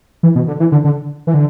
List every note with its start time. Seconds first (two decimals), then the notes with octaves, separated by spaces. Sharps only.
0.23 E3
0.35 B2
0.48 D3
0.60 E3
0.72 D3
0.85 D3
1.27 E3
1.34 D3